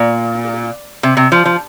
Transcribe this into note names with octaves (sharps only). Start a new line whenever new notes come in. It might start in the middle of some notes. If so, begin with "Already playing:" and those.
Already playing: A#2
C3
C3
F3
F3